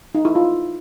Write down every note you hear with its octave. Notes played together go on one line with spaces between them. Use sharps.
D#4
E4
F4